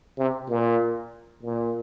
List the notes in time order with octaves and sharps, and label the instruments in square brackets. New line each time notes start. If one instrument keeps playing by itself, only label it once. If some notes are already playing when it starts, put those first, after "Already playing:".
[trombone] C3
A#2
A#2